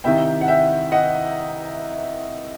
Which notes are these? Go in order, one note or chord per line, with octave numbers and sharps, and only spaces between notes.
C2 C3 D#3 E5 G5
F#5
E5 G5
D#5 F#5